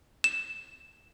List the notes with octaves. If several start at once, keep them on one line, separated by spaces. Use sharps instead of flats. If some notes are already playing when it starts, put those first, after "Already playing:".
E7